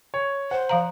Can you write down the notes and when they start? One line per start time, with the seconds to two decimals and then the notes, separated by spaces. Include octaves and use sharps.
0.14 C#5
0.51 C5 F#5
0.69 F3 F5 A#5